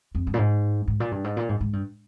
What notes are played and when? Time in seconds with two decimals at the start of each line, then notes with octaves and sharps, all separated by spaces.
0.15 F2
0.27 G2
0.34 A#2
0.38 G#2
0.88 G#2
1.00 A#2
1.12 G2
1.24 G#2
1.37 A#2
1.49 G#2
1.61 G#2
1.73 G2